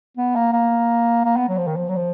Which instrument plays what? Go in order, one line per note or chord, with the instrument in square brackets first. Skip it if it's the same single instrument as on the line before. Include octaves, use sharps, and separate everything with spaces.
[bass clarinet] B3
A#3
A#3
A#3
B3
F#3
F3
D#3
F3
F#3
F3